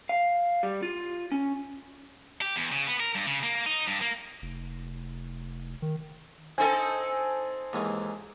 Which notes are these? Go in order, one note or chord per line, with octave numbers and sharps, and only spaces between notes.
F5
G3
F4
C#4
G4
E2
C#3
B3
A#4
G2
C#3
A#3
D#4
G2
A#3
F1
D#3
C4 D#4 A4 G#5
D#2 G#2 E3